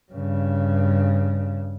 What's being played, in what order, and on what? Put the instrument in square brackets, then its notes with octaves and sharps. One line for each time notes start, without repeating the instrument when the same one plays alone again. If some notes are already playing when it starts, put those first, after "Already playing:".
[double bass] G2 C#3